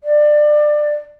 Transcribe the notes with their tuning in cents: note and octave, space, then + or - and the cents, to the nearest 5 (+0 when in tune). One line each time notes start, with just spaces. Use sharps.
D5 +25